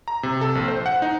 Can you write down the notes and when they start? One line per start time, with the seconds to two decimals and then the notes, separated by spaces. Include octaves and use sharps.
0.08 A#5
0.23 C3
0.41 A4
0.55 A#1
0.68 C5
0.86 F#5
1.02 D#4